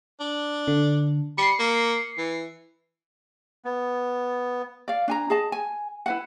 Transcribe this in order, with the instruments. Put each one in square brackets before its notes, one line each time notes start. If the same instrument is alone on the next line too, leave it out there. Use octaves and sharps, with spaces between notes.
[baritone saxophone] D4
[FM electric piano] D3
[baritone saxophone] G3 [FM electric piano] C7 C#7
[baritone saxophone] A#3
E3
[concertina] B3
[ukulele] D5 F5
D4 G#5 A#5
G#4 D#5 A5
G#5
E4 B4 F#5